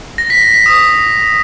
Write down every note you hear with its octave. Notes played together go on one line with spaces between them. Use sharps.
A#6
B6
B6
B6
D#6